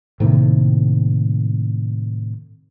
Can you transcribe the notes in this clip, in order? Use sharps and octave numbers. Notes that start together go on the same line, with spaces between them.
A2 C3 D#3 A#3